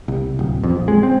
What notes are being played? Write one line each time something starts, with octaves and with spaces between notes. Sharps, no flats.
C2
D1
F2
A#1
G#3
C4